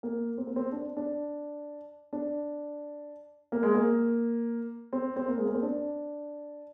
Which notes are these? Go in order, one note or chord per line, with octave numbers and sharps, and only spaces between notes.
A#3
C4
A#3
C4
D4
D4
D4
A#3
G#3
A#3
C4
C4
A#3
G#3
A#3
C4
D4